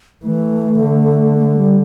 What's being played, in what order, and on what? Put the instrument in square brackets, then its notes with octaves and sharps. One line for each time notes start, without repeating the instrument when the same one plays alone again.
[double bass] E3 [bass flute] A3
[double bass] D3
[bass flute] A3
G3